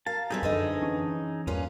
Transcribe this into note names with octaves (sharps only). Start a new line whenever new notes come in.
A#4 F5 A5
E3 G3 C4 D#4 G#4 E5
F#2 D3 F3 B3 D#5
E3 C#4
E2 G2 A#2 C#4 F4 B4